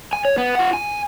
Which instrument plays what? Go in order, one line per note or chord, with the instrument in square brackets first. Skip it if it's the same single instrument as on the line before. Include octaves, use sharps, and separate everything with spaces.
[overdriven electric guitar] G#5
C#5
B3
F4 F#5
G#5